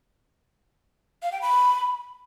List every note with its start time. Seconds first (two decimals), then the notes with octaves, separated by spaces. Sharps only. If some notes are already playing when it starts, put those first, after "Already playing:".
1.23 F5
1.32 G5
1.42 B5